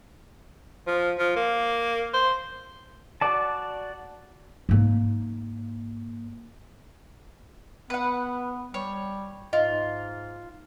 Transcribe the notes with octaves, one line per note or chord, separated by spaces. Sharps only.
F3
F3
A#3
C5
F#4 D5 A5
G#2 A#3
B3 B4 F#5
G3 C#5
G#2 F4 D#5